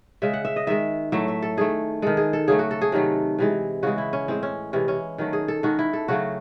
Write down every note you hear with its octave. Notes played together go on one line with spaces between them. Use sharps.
C#3 G#3 E5
F#5
E5
D#5
D#3 G#3 E5
A2 F#3 A3 E5
E5
A4
D#3 A3 G#4
D#3 G#3 A4
G#4
A4
C#3 F#3 A3 G#4
F#4
A4
G#4
C3 D#3 F#3 A3
C3 E3 G#3
C#3 E3 G#3 F#4
E4
C#4
A2 G#3 C4
C#4
C3 E3 G#3 C#4
C#4
D#3 F#3 A3
G#4
A4
D#3 G#3 F#4
E4
A4
C#3 F#3 A3 F#4